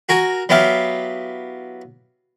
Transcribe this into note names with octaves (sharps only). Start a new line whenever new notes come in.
F#4 A#4 G#5
F#3 B3 E4 G4 F5